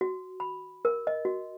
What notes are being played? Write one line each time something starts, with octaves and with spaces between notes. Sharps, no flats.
F#4
B5
A#4
D#5
F#4